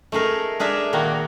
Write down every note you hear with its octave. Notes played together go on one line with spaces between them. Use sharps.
A3 D#4 G#4 A#4
D4 G#4 A#4 E5
A#2 D#3 A#3 D#4 F#4